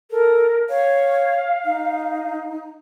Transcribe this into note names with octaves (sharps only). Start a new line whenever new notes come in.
A4 A#4
C#5 F5
D#4